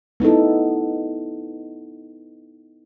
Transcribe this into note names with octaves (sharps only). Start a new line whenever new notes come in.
B3 D#4 E4 A4